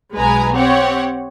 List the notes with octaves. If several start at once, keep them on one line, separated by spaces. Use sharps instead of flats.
B1 G#3 B4 G#5 A#5
C4 G4 C#5 F#5